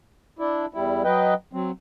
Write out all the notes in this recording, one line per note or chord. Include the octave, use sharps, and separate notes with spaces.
D4 E4
E2 G3 E4
F#3 B4 D#5 G5
F#3 C4